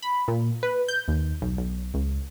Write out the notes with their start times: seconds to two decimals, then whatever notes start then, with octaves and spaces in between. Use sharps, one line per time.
0.02 B5
0.28 A#2
0.63 B4
0.88 G6
1.08 D#2
1.42 B1
1.58 B1
1.94 C#2